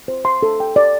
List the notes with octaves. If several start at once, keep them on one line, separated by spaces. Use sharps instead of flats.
C5
C6
A4
G5
D5